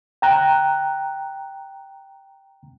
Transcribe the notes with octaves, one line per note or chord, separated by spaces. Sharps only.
G5 A#5 F#6